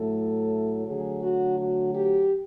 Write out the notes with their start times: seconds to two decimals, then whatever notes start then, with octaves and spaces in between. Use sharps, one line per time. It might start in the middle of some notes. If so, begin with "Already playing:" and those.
Already playing: A2 F#3 A3 A4
0.86 D3 F#3 A3 G#4
1.22 F#4
1.58 F#4
1.93 G4